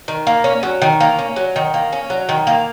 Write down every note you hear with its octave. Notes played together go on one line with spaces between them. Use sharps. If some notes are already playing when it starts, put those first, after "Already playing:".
D#3
A#3
C#4
F#3
D#3
A#3
C#4
F#3
D#3
A#3
C#4
F#3
D#3
A#3